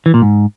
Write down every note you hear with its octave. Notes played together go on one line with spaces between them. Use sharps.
E3
A#2
G#2